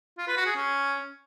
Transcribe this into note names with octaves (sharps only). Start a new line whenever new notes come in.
F4
B4
F#4
G#4
C#4